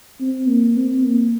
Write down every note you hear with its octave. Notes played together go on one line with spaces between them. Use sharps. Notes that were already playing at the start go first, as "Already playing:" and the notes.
C4
A#3
C4
A#3